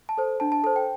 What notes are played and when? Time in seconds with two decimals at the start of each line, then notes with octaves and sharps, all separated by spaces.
0.09 A5
0.18 A4 C5
0.40 D4 A5
0.52 A5
0.64 A4 A5
0.66 C5
0.76 G5